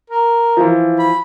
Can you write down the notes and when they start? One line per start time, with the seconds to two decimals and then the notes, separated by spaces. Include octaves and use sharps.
0.10 A#4
0.57 E3 F3
0.99 B5